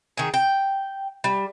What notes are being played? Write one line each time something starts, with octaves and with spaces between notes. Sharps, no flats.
D#3 G#4
G5
G3